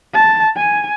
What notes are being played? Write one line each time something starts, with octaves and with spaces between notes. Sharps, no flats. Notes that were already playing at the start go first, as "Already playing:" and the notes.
A5
G#5